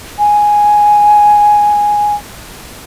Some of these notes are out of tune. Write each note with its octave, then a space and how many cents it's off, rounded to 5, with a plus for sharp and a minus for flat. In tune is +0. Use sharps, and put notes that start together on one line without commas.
G#5 +0